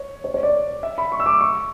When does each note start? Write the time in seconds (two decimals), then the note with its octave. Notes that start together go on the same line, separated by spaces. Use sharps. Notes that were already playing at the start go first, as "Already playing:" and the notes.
Already playing: C#5
0.24 C#5
0.34 C#5
0.43 D5
0.83 E5
0.98 B5
1.12 C#6
1.20 E6
1.26 D6
1.41 C#6